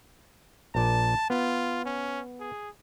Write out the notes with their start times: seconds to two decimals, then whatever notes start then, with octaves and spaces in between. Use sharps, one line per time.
0.75 A#1 A#2 D5 A5
1.30 B3 F4
1.86 C#4
2.40 G#4